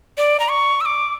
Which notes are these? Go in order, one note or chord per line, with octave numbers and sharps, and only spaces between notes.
D5
A#5
C#6
E6
D6